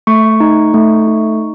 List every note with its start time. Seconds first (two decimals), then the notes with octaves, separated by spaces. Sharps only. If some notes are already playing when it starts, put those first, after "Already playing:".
0.07 A3 C#6
0.40 D#4
0.74 A3
1.07 D#4